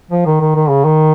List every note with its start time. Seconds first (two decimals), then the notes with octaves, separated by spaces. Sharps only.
0.11 F3
0.26 D#3
0.41 D#3
0.55 D#3
0.70 C#3
0.85 D#3